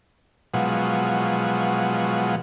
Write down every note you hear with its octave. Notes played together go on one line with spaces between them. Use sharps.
B2 F3 F#3 G#3